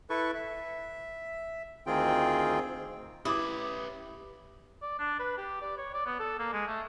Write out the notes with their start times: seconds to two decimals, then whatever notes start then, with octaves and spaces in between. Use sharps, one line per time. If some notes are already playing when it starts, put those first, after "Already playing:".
0.10 E4 A4 B4 C#6
0.35 E5
1.87 D2 D#3 C4 F4 G#4 G5
3.25 C#4 E4 G4 B4 D6 D#6
4.82 D5
4.99 D4
5.19 B4
5.38 G4
5.62 D5
5.78 C#5
5.94 D5
6.06 B3
6.20 A4
6.39 A#3
6.53 G#3
6.67 A3